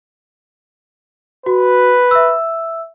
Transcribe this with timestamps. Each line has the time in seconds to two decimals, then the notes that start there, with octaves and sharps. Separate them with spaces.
1.46 F#4 B4
2.11 E5 E6